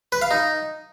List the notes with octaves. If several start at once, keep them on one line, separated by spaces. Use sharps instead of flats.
B4
F5
D#4